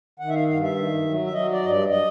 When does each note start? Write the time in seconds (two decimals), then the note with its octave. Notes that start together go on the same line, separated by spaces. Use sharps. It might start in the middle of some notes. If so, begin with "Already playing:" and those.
0.19 D#3 F#5
0.29 E5
0.34 F5
0.48 G2 F5
0.63 E5
0.76 D#3
1.05 F#3
1.25 E5
1.33 F#3 D#5
1.53 D5
1.62 G2 D#5
1.71 D5
1.90 D#5